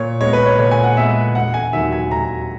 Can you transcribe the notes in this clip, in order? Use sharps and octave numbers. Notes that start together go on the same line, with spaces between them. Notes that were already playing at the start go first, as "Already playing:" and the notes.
Already playing: A#2 C#5
G#3 B3 C#5
B4
C#5
A#2 C#5
G#5
F#5
G#3 B3 E5
E1 F#5
G#5
D#2 D#3 F#3 E5
G#5
E1 A#5